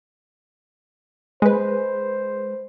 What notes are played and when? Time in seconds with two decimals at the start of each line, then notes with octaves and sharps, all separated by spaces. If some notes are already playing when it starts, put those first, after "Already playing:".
1.42 G#3 B4 C5